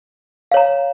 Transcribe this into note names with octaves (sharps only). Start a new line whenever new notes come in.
C#5 F5 A#5